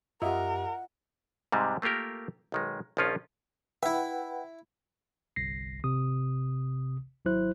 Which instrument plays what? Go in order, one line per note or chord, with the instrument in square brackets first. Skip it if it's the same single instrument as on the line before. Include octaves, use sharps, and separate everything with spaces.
[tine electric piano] F#2 G4 [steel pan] F4 D#5 E5 [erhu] A#4 [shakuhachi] F#5
[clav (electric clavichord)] G#2 C3 G3 G#3
A3 A#3 F4 G4 A#4
B1 D#3 G#3
A#1 D#3 F3 C#4 F4
[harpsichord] E4 E5 [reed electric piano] B4 F#5 G5
[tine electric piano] G1 C2 A#6 C7
G#1 C3 D#6
G#1 F#3 E4 C5 F#6